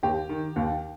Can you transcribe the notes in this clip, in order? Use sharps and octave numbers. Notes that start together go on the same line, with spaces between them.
D#2 G4
D#3
D#2